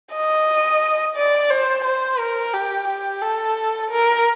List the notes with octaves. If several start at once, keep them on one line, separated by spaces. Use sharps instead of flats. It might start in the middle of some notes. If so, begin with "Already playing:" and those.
D#5
D5
C5
C5
A#4
G4
G4
A4
A#4